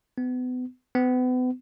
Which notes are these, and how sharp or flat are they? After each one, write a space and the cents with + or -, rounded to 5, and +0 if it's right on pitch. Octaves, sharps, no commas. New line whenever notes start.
B3 +30
B3 +35